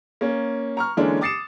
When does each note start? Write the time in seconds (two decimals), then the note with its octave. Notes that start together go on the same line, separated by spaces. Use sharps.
0.21 A#3 C#4
0.77 A#5 C#6 F6
0.97 D3 E3 G#3 A#3 C#4 D4
1.21 D6 D#6 A6 C7 C#7 E7